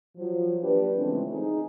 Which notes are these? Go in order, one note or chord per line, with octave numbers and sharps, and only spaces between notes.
F3 F#3
A#3 D4 G4 B4
C#3 E3 F3 G#3 A3 C4
D#4 G#4